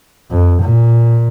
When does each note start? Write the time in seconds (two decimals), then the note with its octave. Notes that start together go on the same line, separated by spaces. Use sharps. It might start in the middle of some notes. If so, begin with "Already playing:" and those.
0.31 F2
0.61 A#2